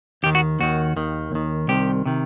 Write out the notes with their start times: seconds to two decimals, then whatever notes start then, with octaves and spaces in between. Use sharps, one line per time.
0.23 D#2 D#3 G4
0.35 F#4
0.60 D#2 D#3 F#4
0.96 D#2 D#3
1.32 D#2 D#3
1.68 C2 C3 D#3 G4
2.05 C3 D#3